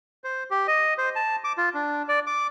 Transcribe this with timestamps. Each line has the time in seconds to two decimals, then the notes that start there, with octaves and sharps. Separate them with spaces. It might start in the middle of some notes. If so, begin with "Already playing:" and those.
0.24 C5
0.51 G4
0.68 D#5
0.98 C5
1.16 A5
1.44 D6
1.58 F4
1.74 D4
2.08 D5
2.27 D6